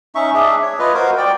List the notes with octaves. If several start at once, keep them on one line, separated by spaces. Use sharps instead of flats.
C#4 D#4 E5 C#6
D4 G#4 E5
C#5
F4 B4 D#5
F#4 A#4 C5
D5 G5